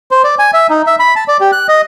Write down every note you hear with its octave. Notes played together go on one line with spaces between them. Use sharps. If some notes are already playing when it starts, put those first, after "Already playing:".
C5
D5
G#5
E5
D#4
E5
B5
A5
D5
G4
F#6
D#5